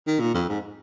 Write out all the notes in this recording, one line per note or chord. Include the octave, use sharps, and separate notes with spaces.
D#3
A#2
F2
G#2